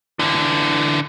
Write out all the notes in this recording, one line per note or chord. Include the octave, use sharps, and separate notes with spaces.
D3 E3